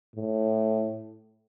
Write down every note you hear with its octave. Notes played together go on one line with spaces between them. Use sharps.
A2